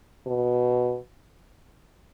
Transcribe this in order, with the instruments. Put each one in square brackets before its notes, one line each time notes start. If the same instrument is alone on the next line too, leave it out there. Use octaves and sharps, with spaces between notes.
[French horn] B2